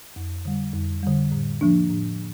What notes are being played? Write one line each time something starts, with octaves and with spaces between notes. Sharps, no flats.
F2
D3 G3
F2
D3 G3
A2
F3 A#3 D4
A2